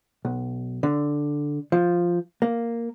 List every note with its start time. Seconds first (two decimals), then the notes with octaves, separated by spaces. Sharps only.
0.25 B1
0.83 D3
1.72 F3
2.42 A#3